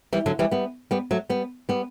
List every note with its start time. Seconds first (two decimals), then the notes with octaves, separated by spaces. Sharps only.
0.13 E3 G3
0.26 D3 F#3
0.39 E3 G3
0.51 G3 B3
0.91 G3 B3
1.11 F#3 A3
1.29 G3 B3
1.69 G3 B3